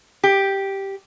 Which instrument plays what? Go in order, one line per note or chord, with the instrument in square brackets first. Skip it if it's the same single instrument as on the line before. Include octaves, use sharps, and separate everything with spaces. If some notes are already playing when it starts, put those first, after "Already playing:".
[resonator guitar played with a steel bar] G4